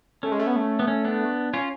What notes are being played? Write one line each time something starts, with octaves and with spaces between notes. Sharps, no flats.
A3 C#4
G#3
A3
B3
A3
B3
C#4
B3 D4
C#4 F4